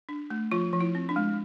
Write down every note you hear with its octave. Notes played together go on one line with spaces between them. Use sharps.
D4
A3
F3 F4
F3
E4
C4
D4
G#3